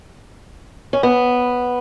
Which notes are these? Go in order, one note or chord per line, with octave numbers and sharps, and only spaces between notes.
C#4
B3